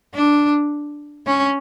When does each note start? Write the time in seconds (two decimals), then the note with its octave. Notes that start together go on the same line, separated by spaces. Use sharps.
0.15 D4
1.26 C#4